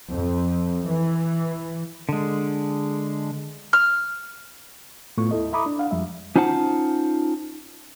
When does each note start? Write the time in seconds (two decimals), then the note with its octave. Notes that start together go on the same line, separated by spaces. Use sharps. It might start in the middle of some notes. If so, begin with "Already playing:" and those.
0.11 F2
0.88 E3
2.09 D3 G#3
3.73 F6
5.17 A2 A3 B3 F4 C#6
5.31 D#2 E4 A4 D#5
5.53 E5 A#5 B5 D6 D#6
5.66 D4
5.78 D4 F5 F#5
5.91 F2 F3 G3 G#3 E5
6.36 C#4 D#4 F4 C5 F#5 A5